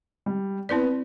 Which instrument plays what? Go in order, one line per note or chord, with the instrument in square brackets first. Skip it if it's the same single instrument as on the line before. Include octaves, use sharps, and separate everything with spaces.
[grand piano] G3
[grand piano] B3 [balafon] C4 E4 B4 D5